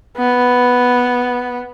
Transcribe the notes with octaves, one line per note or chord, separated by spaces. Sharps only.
B3